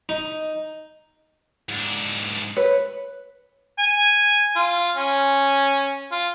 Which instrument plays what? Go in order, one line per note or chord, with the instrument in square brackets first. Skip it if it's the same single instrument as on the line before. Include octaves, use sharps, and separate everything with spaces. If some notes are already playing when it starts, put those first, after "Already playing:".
[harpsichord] D#4
[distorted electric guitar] G#2 D4
[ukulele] B4 [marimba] C#5
[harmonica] G#5
F4
C#4
F4